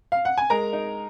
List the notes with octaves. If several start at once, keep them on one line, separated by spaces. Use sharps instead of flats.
F5
F#5
G#5
G#3 A#4 A#5
D#4